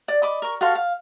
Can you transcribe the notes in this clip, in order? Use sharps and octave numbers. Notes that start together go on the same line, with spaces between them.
D5
D#5 B5 D6
A#4 C#6
F#4 A4 F5 C6
F5